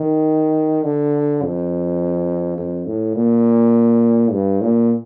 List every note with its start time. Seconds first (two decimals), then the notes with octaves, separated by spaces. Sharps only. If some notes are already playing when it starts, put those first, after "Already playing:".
Already playing: D#3
0.85 D3
1.43 F2
2.58 F2
2.86 A2
3.16 A#2
4.32 G2
4.61 A#2